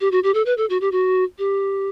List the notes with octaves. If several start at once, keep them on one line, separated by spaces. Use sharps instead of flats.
G4
F#4
G4
A4
B4
A4
F#4
G4
F#4
G4